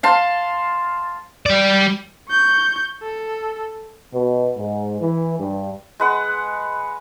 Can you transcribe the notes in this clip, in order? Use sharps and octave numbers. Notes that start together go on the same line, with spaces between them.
F5 A5 C6
G3 D5
C#6 G6
A4
B2
G#2
E3
G2
G#3 B4 F#5